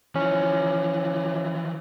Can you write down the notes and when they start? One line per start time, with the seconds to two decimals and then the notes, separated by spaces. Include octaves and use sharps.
0.15 E3 F3 C#4